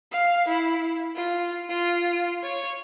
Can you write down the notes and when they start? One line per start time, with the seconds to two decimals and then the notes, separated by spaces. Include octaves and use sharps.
0.12 F5
0.48 E4
1.15 F4
1.69 F4
2.43 C#5